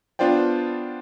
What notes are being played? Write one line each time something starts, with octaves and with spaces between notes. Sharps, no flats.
B3 D4 F4 C5 D5 G5